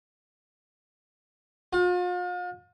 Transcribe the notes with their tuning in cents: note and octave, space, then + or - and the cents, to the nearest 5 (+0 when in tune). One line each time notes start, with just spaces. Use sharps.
F4 +40